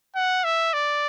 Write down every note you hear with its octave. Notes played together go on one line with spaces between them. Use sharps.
F#5
E5
D5